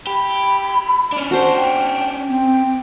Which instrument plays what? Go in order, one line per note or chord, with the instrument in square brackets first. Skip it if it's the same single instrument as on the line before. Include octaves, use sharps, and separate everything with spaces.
[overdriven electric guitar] G4 [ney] B5
[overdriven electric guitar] C#4 D4
[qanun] F#4 C5 [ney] A5
[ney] G5
[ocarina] C4 [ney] G5